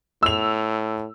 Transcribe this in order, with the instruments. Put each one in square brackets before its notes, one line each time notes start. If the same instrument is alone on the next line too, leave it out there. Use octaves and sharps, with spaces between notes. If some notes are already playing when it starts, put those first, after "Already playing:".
[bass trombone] A2 [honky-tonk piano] E6 F7